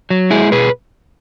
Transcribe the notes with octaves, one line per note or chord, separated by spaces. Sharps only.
F#3
G#3 E4 G#4
B2 G#4 B4